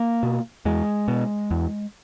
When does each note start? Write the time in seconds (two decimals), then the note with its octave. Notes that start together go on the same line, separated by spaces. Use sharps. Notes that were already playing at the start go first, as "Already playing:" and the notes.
Already playing: A#3
0.23 B2
0.65 E2 G#3
1.08 B2
1.51 E2